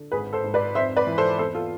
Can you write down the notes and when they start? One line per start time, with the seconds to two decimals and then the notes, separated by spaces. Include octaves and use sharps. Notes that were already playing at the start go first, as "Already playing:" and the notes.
Already playing: D3
0.12 G#1 G#4 B4
0.33 A4 C5
0.44 G#2
0.54 B4 D5
0.75 F2 C5 E5
0.96 B4 D5
1.07 E3
1.18 A4 C5
1.38 E2 A4 C5
1.55 F4 A4